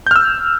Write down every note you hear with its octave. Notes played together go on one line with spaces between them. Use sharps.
E6 F6 G6